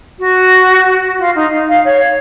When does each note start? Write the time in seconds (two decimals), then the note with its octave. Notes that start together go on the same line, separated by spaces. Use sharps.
0.19 F#4
1.19 F4
1.35 D#4
1.68 F5
1.85 C#5